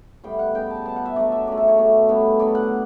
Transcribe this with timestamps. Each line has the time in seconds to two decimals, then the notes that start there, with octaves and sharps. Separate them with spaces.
0.24 A2 G3 B3 G5
0.39 F#5
0.55 C#3 G3 B3 G5
0.70 A5
0.85 B2 G3 B3 A5
0.96 F#5
1.06 E5
1.16 D3 F#3 A3 D5
1.32 E5
1.47 C#3 F#3 A3 D5
1.57 A4
1.68 C#5
1.78 B2 A3
2.08 D3 G3 B3
2.39 B2 F#3 B3 D5
2.55 F#5